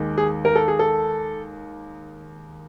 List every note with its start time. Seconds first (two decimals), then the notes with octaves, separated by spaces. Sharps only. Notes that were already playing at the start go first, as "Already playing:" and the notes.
Already playing: D#2 D#3 G#3
0.18 G#4
0.45 A#4
0.55 A4
0.68 G#4
0.79 A4